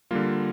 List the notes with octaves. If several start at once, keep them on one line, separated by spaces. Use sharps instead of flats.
D3 G3 A#3 F4